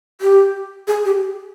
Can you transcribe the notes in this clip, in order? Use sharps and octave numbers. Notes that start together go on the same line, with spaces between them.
G4
G#4
G4